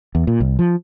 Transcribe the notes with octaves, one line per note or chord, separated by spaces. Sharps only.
E2
A#2
C2
F3